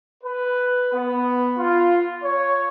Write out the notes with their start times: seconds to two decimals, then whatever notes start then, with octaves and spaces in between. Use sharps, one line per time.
0.24 B4
0.93 B3
1.58 F4
2.23 C#5